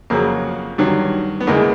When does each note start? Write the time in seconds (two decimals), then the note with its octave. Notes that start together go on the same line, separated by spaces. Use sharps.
0.10 F2 C#3 F#3 A#3
0.78 G2 D#3 F#3
1.40 B3
1.47 E2 C#3 E3 G#3 A#3